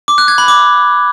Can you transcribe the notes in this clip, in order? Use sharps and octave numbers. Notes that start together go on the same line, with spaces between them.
D6
F#6
G#6
B5
D6